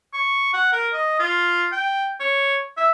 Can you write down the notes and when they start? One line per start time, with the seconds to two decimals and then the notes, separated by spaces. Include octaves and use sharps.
0.13 C#6
0.53 F#5
0.72 A#4
0.93 D#5
1.19 F4
1.72 G5
2.20 C#5
2.77 E5